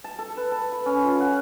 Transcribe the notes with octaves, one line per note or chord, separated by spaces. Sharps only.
A5
A4
B4
A5
B5
C#4
F4
F#5